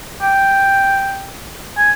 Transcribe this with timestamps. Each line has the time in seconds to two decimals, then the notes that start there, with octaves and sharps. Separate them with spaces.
0.22 G5
1.77 G#5